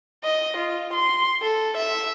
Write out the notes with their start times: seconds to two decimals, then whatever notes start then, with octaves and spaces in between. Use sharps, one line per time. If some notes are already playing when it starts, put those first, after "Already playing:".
0.24 D#5
0.57 F4
0.94 C6
1.42 A4
1.78 E5